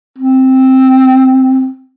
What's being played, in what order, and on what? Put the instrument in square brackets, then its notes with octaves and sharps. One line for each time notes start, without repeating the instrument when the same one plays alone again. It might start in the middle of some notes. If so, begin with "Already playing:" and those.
[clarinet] C4